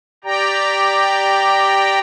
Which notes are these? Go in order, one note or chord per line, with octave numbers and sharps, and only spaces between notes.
G4 D5 G5 A#5